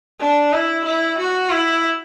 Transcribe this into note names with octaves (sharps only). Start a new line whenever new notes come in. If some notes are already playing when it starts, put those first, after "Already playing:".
D4
E4
E4
F#4
E4